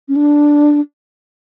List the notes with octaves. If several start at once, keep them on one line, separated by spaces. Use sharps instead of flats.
C#4
D4